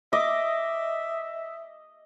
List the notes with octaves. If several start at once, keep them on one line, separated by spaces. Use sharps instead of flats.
D#5 E5 D6